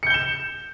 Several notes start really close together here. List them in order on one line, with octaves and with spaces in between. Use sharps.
C#7 G6 G7 E7